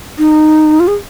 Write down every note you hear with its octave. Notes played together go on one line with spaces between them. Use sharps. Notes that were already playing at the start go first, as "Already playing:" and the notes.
D#4
F4
G#4